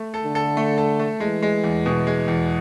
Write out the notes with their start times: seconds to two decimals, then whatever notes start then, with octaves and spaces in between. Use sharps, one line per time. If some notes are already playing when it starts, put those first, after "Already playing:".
Already playing: A3
0.14 A4
0.24 D3
0.35 A4
0.57 A3
0.78 A4
0.99 A3
1.20 E3 G#3
1.42 G#3
1.64 E2
1.86 B2
2.07 G#3
2.28 E2